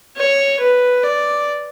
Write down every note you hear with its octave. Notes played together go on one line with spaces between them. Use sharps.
C#5
B4
D5